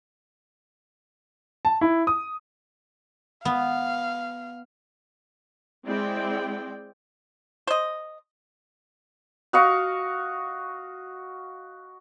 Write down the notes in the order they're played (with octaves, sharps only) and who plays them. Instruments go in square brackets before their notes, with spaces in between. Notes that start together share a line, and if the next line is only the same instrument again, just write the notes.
[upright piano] A5
E4
D#6
[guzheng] B3 [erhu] F5
[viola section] G#3 C4 E4 D5 G5
[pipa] C5 D#5
[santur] F#4 D#5 F5 C#6